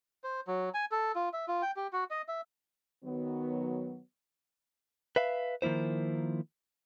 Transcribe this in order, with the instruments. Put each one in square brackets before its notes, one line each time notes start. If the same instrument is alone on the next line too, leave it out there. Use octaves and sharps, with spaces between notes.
[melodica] C5
F#3
G#5
A4
F4
E5
F4
G5
G4
F#4
D#5
E5
[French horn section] D#3 F#3 B3
[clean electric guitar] B4 E5 F5
D#3 F3 A#3 E4 C5